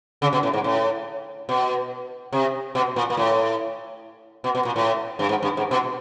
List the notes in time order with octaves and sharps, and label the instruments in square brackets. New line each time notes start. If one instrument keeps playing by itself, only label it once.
[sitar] C#3
B2
A2
G#2
A2
B2
C3
B2
A#2
A#2
A2
B2
B2
A#2
A2
G2
G#2
G2
G#2
B2